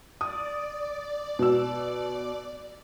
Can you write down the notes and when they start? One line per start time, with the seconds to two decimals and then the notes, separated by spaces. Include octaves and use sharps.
0.21 D5 D#6
1.39 B2 E6